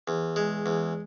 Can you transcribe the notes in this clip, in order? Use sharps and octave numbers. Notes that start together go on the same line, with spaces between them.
E2
G#3
E2